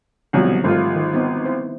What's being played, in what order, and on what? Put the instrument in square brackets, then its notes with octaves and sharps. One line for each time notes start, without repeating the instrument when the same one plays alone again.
[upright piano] C2 B2 F#3 [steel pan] D3 F3 C#5
[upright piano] G#1 F4 [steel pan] G3 A3 A#4
[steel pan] D#3
B3 C4 D#4
E4 C5